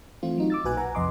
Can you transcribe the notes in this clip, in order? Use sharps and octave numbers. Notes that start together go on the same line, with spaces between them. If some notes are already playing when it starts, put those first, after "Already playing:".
E3 A3 C4 F4
F#3 D#4 F#4
D6 E6 A6
B1 A#2 F#4 B4 G#5 F#6
B4 F#5 G#5 A#5
F2 C3 D#5 C6 D6